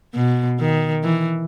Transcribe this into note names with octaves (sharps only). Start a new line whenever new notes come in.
B2
D#3
E3